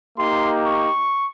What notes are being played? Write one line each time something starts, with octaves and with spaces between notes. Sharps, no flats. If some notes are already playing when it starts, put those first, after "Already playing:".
A#3 D#4 G4 C6
C#6